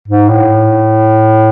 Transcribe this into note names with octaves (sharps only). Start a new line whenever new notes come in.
G#2
A2